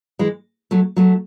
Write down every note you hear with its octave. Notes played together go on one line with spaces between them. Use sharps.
E3 G#3
F#3 A3
F#3 A3